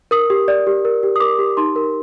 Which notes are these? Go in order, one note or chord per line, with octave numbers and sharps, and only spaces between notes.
A#4 D#6
G4
D5
G4
A#4
G4
D#6
A#4 D6
G4
D#4 C6
A#4